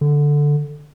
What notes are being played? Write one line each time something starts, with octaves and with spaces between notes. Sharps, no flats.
D3